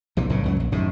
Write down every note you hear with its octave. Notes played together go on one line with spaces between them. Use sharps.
A#1 C3 E3
B1 A2 C#3
C#2 F#2 F#3
A#1
F#2 A2 C3 D#3